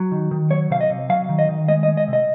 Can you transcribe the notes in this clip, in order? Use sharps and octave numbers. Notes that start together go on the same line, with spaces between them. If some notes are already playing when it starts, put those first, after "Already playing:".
Already playing: F#3
D#3
D#3
F#3 C#5
C3 F5
D#5
C3
F#3 F5
D#3
D#5
D#3
G#3 D#5
D#5
G#3
D#5
C3
D#5